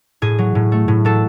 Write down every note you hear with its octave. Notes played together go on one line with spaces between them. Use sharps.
A2 G#4
F#3
A2
A3
A2
F#3 A4